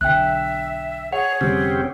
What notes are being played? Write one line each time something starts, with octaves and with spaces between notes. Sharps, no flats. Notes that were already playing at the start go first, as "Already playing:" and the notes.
B1 D3 E5 G5 F#6
G#4 C#5 F#5
F1 D3 G3 C4 C#4 G4